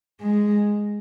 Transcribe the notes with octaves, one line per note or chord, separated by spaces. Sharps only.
G#3